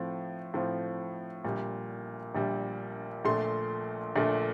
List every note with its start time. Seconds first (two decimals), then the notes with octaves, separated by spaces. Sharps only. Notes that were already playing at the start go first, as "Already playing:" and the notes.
Already playing: A2 F3 C4
0.54 A2 F3 C4
1.44 A#1 A#2 G3
2.35 A#1 A#2 G3
3.24 A#1 A#2 A3 C6
4.15 A#1 A#2 A3